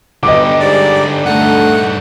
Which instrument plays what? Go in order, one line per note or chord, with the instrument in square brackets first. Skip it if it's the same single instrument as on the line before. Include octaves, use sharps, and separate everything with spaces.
[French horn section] G2 B3 [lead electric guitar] D3 G4 [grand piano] D#5 D6
[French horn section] G#2 G3 [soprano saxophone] D5
[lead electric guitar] G2 D#4 [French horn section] D3 A3 [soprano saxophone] F#5